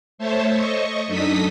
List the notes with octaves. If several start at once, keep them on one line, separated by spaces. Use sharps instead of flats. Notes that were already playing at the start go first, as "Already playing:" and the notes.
A3 C5 C#5 E5 A5
D#5 C#6
F#2 D4 D#4 A4 D#6 B6